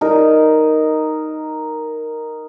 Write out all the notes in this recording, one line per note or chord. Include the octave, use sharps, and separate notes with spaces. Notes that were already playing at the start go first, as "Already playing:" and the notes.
D#4 A#4 D#5